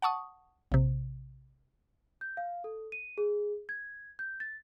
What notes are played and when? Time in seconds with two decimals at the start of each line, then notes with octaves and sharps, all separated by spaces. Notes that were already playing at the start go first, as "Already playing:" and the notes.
0.02 F#5 A5 C#6 D#6
0.72 A#1 C3
2.21 G6
2.37 F5
2.64 A4
2.92 D#7
3.18 G#4
3.69 G#6
4.19 G6
4.40 A6